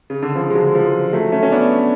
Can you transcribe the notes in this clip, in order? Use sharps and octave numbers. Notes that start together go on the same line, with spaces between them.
C#3
D3
C#3 F3
G#3
D3 F#3
F3 G#3
F#3 A3
A3 C#4
C#4
B3 D4